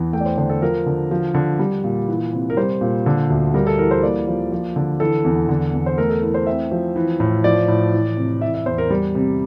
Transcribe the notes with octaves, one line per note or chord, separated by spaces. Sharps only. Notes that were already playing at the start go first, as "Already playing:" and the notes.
Already playing: E2 E3
A3 G5
D5
C5
D3 C5
A4
F3 A#4
D3
F3
D3
G3
A#2
E3
C3
A#4
G3 C5
A#2
D3
D2
G3 A#4
A4
E3 A#4
C5
A#3 D5
F3
F3
D3
E3 A4
E2
D3
E2
C5
A3 A#4
A4
E3 A#4
C5
C4 E5
F3
E3
A2
F3 D5
A2
E3
C3
E3 E5
E5
E2 C5
A#4
G3
C3